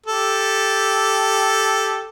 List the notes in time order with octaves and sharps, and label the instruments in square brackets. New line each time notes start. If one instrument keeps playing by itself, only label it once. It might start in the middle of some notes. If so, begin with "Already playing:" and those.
[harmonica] G4 A4